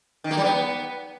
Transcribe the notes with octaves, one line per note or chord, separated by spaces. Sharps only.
D#3
A#3
G3
B3